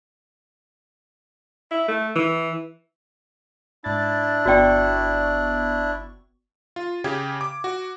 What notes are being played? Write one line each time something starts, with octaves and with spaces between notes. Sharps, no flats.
E4
A3
E3
G#2 D4 E4 A6
G1 B3 F#4 D5 G5 C#6
F4
C#3 G4 G#6
D6
F#4